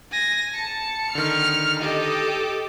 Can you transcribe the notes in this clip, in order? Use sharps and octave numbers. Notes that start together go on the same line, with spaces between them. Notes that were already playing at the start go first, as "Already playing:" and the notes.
G#5 A#6
A5 C#7
D3 D#3 F6
G4 A4 D#5